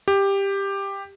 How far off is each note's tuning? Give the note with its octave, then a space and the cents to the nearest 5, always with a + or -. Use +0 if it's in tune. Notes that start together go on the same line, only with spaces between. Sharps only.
G4 +10